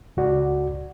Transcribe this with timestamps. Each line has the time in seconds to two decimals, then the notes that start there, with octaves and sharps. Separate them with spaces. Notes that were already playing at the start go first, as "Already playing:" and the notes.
0.17 C#2 F#4 D5